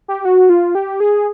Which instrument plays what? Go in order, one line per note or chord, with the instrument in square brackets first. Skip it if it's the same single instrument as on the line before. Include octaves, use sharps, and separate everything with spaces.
[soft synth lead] G4
F#4
F4
G4
G#4